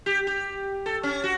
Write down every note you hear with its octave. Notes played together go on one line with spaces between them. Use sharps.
G4
G4
A4
C#4
F#4